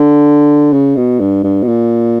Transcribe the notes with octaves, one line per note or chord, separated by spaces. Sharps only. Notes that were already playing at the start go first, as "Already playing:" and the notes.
Already playing: D3
C#3
B2
G2
G2
B2
A#2